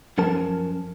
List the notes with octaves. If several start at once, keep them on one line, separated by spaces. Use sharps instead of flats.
F#2 F3 C#4 A#4 A5